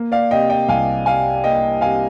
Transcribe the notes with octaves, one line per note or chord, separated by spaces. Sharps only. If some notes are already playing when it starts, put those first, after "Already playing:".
Already playing: A#3
D5 F5
C3 D#5 G5
D#5 G5
C2 F5 G#5
G3 F5 G#5
A#3 D#5 G5
C3 F5 G#5